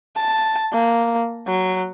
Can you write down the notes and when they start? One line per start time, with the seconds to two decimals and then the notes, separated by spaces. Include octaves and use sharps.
0.16 A5
0.73 A#3
1.47 F#3